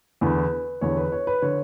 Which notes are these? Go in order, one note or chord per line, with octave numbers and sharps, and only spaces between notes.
E2 D3 B4
E2 D3 C#5
B4
C#5
B4
D3 C#5